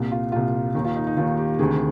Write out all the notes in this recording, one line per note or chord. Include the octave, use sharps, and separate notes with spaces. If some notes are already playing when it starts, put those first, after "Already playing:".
Already playing: C2 A#2
F4
C2 A#2 F4
D#2 D#3 D#4
F4
D#4
D#4
D#2 D#3 F4
G4
D2 C3 D#3 G#4